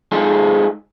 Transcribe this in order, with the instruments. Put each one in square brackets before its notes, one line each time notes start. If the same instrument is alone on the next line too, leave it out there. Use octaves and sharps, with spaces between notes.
[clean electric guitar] G#3 D#4 F4 G#4 A4